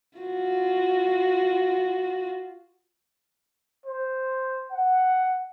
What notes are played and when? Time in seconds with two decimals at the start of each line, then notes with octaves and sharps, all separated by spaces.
0.19 F4 F#4
3.86 C5
4.72 F#5